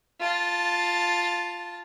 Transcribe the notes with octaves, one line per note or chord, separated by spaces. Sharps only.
F4 A5